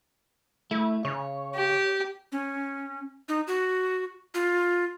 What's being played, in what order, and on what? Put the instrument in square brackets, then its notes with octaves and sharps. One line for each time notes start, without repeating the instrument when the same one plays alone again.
[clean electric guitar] A3 [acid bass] E4
[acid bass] C#3 [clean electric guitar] C#5
[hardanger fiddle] G4
[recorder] C#4
D#4
F#4
F4